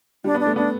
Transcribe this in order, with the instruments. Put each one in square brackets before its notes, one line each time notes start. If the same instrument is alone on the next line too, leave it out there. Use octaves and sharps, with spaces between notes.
[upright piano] G3 [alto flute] D4
[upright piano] B3
[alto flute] D4
[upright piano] A3
[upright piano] B3 [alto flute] D4